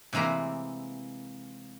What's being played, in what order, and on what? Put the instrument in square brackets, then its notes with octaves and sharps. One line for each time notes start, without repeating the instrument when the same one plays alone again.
[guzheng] C3 E3 G#3 A#3 A#4